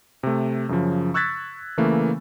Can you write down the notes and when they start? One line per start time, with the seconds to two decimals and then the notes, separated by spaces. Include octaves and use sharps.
0.23 C3 A3
0.69 F#2 C#3 F3
1.14 C#6 E6 F#6 G#6 A6 B6
1.77 C#3 E3 A3 A#3